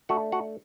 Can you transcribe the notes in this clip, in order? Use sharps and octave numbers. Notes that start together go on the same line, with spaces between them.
A3 D4 F#4 F#5
F#4 F#5